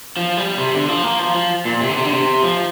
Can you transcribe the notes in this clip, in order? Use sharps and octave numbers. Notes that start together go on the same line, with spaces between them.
F3
G3
C3
D3
F3
A#3
F3
F3
A#2
C3
D3
C3
D3
C3
F3